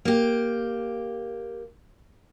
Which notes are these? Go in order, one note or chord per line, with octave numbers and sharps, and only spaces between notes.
A#3 G4